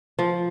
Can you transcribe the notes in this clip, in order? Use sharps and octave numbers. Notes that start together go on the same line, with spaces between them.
F3